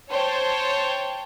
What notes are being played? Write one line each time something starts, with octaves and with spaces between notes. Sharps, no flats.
C5 C#5 G5 A5